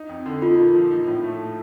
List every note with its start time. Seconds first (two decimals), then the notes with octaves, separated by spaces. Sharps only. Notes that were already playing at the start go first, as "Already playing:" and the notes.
Already playing: D#4
0.09 F2
0.26 D3
0.42 D#4 F4
0.59 A#2
0.75 F3
0.90 D#4
1.07 A2
1.23 A3